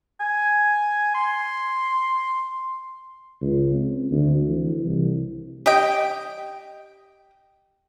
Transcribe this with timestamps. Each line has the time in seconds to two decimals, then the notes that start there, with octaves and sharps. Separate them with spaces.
0.20 G#5
1.15 C6
3.41 C#2
3.74 C4
4.11 D2
4.48 E3
4.85 C2
5.66 G4 D#5 G5